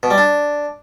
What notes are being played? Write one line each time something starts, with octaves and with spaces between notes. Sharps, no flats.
B2
G3
D4